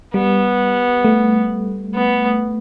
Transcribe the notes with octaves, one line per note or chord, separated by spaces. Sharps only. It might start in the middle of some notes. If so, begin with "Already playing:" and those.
G3 B3
A3
B3